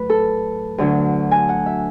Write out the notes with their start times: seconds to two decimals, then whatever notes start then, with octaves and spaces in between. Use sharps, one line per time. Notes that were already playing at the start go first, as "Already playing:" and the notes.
Already playing: A2 F#3 B4
0.10 A4
0.78 D2 D3 F#3
1.31 G#5
1.49 F#5
1.66 E5